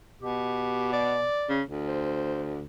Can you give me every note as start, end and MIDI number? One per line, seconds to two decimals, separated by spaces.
0.22 1.28 47
0.22 0.89 67
0.93 1.58 74
1.49 1.62 49
1.68 2.63 38
1.88 2.53 72